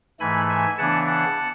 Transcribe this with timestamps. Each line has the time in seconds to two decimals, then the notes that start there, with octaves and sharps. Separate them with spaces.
0.20 G#2 E3 A3 G#5 B5
0.49 E5 G#5
0.78 C#3 E3 B3 D4 F#5 A5
1.07 F#5 A5